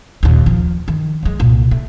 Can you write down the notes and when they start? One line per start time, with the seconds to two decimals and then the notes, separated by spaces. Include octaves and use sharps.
0.23 D#2 A#2
0.46 F3
0.88 D#3
1.23 F#3 G#3
1.40 C2 A#2
1.71 A3